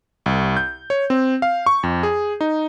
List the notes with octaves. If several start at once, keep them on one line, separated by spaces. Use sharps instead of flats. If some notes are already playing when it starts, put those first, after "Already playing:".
C2
G6
C#5
C4
F5
C#6
F2
G#4
D#4